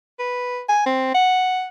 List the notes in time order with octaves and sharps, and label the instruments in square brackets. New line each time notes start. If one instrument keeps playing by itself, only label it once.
[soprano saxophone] B4
G#5
C4
F#5